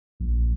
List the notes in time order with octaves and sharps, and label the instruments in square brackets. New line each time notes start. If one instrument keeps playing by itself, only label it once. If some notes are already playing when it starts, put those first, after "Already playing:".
[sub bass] A#1